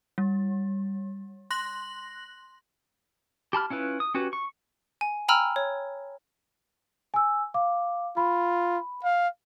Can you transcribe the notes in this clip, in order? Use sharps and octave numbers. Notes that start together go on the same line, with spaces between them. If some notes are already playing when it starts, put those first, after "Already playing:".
G3
C6 F#6 A#6 F#7
G4 A5 B5 F6
C#4 E4 F4 B4
D#6
C#4 F#4 G4 B4
C#6
G#5
G5 G#5 A#5 B5 E6 F6
C#5
G#5 E6
F5 D6
F4 B5
F5